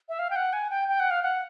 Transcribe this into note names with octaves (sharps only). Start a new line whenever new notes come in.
E5
F5
G5
F#5
G#5
G5
G5
F#5
F5
F#5